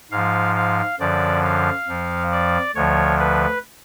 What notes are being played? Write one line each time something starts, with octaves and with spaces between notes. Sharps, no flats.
G#2 F3 F5
F5
F#2 D3 F3 D5
F5
F2 F3
D5
D2 D3 F3 C#5
B4